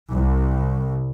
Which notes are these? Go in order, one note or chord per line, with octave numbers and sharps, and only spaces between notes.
C2